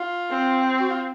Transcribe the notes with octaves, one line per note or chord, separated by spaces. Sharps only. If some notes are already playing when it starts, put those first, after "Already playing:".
Already playing: F4
C4
F#4
F4